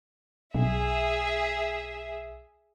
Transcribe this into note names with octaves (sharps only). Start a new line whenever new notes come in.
B1 G#4 E5